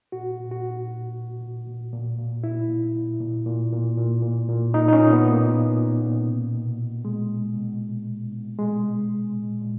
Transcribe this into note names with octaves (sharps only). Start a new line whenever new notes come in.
A#2 F#4
A#2
F#4
A#2
A#2
A#2
A#2
A#2
A#2
A#2
A#2 E4
A#2
A#2
A#2
A#2
A#2
A#2
A#2
A#2
A#2 D#4
D#4
C#4
A#2
B3
A#2
A#3
A#2
A#2
A#2
B2
B2
B2
B2 G#3
B2
B2
B2
B2
B2
B2 G#3
B2
B2
A#2
A#2